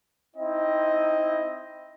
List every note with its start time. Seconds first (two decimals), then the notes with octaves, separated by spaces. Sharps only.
0.35 C4 D#4 E4 D#5